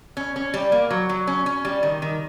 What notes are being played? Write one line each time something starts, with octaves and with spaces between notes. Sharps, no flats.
C#4
C#4
G3
A#3
F#3
F#3
C#4
C#4
G3
D#3
D#3